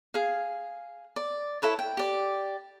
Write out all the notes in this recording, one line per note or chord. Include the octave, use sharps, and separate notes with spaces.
G#4 F5
D5
E4 A4 B4 C#5
G5
G4 D5